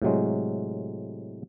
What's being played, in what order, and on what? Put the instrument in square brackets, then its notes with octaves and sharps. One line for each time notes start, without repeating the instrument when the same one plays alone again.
[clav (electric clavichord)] A2 C3 F#3 G#3